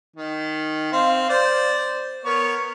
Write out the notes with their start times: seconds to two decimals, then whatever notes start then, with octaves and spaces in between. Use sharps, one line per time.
0.16 D#3
0.92 C4 F5
1.29 C5 D5
2.25 B3 A#4 C#5